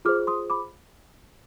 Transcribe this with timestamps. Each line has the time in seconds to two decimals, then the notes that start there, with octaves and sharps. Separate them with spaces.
0.05 F4 G#4 C5 D6 F6
0.27 C6 D#6
0.50 B5 D6